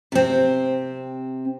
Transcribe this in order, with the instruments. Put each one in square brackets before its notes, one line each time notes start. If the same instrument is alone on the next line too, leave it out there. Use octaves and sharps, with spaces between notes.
[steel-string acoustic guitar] C3 C4